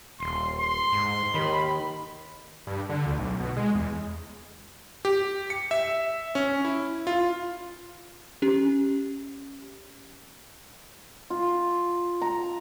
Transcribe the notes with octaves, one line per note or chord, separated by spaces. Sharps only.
D#1 C6
C6
G#2
D#2 D#3 B5
G2
D3
D2
B1
B2
G#3
E2
G4
C#7
E5
C#4
E4
F4
C#4 G4
F4
A#5